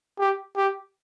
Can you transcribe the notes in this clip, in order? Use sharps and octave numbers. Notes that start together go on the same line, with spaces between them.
G4
G4